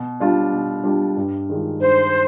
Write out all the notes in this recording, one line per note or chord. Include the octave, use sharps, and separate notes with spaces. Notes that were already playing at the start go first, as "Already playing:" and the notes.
Already playing: B2
G3 D4 F4
B2
G3 D4 F4
G2
D#3 G#3 D4 F4
G2 C5